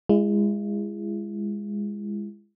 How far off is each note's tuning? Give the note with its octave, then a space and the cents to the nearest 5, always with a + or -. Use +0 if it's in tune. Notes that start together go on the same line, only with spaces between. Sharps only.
G#3 -15 E4 +40